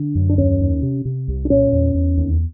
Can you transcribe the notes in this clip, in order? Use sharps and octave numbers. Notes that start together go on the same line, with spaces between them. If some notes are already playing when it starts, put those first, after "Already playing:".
Already playing: D3
F#2
D4
D#2 C#4
D#2
C3
C3
C2
D4
A#2 C#4
E2
E2
D#2